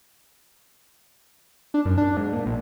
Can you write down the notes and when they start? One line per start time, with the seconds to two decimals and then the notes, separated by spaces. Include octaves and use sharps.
1.74 D4
1.85 F#2
1.98 D4
2.17 G#2
2.33 A#2
2.46 A#1